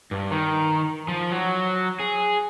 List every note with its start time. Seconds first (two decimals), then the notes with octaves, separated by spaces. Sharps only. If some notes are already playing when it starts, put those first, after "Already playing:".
0.11 G2
0.31 D#3
1.08 F3
1.31 F#3
2.00 G#4